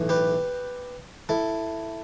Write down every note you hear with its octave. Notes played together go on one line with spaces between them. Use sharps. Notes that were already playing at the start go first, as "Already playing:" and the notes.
Already playing: B1 A2 E3
G4 B4
E4 A4